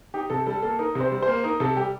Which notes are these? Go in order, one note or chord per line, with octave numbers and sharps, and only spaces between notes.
D#4 G4
C3 A4
G3 A4
A#3 A4
D#4 A#4
C3 C5
G3
A#3 C5
D#4 A#4
C3 A4
G3 G4